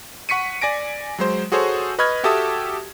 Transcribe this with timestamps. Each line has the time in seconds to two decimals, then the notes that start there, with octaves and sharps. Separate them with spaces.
0.29 F#5 C#6 B6 C#7 D#7
0.61 D5 G#5 A#6 D7
1.19 F#3 G#3 C5
1.52 F#4 G#4 A4 C5 C#5
1.99 B4 D#5 B5 C#6 F6 G#6
2.24 F#4 G4 A4 E5 A5 D#6